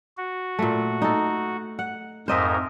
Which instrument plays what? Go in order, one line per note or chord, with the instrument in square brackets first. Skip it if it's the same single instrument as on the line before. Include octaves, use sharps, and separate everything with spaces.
[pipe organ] F#4
[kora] A#2 A3
D#4 A4
F#5
[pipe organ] F2 G#2 A#4 [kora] C5 D#5 E5